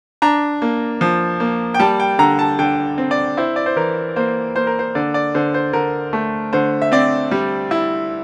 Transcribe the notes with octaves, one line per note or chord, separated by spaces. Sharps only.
D4 A#5
A#3
F3
A#3
G5
G3 A5
G5
D3 A#5
A5
D3 G5
C4
D5
E4 C5
D5
C5
E3 A#4
A#3 C5
A#3 C5
A#4
C5
D3 D5
D5
D3 C5
C5
D3 A#4
A3
D3 C5
E5
C4 D5
G3
E4